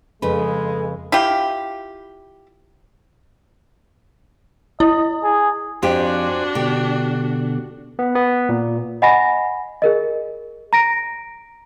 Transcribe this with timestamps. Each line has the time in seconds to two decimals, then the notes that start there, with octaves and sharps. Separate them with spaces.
0.22 F2 C#3 G#3 A4 B4
1.12 E4 F4 G4
4.80 E4 D#5
5.24 G#4
5.82 F2 D4 F#4 G4 C5 G#5
6.55 B2 D3 G4
7.99 B3
8.15 B3
8.49 A#2
9.02 D#5 F#5 G#5 B5 A#6
9.82 G#4 A#4 D#5
10.73 A#5 A#6 D7